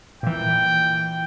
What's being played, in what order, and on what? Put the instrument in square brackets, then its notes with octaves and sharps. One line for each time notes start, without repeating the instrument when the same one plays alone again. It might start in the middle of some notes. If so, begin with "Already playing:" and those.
[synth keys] A#2 E3 [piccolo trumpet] G5